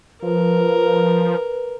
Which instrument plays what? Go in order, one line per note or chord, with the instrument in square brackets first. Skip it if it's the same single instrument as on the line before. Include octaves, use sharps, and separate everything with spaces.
[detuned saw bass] F3 [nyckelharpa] A#4 [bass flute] B4